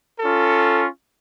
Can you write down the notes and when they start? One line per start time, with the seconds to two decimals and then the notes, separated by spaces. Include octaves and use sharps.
0.20 C#4 F4 A4